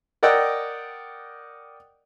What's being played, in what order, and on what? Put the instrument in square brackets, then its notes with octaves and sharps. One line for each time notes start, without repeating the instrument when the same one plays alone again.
[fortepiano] A#4 D5 D#5 F#5 G5 E6